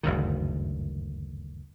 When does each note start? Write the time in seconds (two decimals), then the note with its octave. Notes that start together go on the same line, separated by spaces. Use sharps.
0.03 F#1 D2 G2 D#3